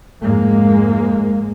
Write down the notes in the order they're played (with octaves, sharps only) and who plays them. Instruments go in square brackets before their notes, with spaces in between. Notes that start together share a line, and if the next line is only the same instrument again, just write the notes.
[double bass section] F2 G#2 G#3 A#3